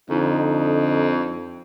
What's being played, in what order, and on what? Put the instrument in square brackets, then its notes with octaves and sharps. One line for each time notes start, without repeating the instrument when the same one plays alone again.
[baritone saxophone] F2 [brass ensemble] D3 D#4